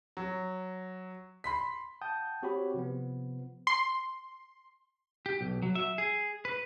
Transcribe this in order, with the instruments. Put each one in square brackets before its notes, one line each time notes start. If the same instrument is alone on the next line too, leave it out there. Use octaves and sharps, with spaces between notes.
[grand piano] F#3
B5 C6 B6
[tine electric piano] F#5 G5 A5 D#6 G6
C4 F#4 G4 C#5 B5
C3 F3 B3
[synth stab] C6
[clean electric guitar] G4
B1
F#3
E5
G#4
B4